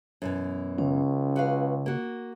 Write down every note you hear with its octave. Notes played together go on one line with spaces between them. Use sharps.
F#2 B2 E3
C#2 C#3 C#4
F#4 B4 F5
A#3 F#4